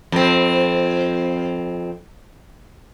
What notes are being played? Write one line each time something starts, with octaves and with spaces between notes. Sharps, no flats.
F2 C4